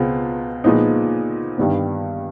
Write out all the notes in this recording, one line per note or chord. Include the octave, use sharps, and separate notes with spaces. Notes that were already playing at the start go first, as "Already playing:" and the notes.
Already playing: C#2 B2 G#3 C4 F4
A#2 F3 G#3 B3 D#4
G2 D#3 G3 B3